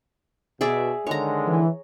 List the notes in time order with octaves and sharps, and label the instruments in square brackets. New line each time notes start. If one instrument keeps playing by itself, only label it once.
[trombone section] B2 [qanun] G#4 D5 E5
[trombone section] D3 D#3 G#3 [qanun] C#5 A#5
[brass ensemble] E3